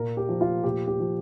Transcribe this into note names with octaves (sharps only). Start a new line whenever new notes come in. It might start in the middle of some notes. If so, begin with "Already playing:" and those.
Already playing: A#2 A#4
G4
F3
F4
A#2 G4
G4
F3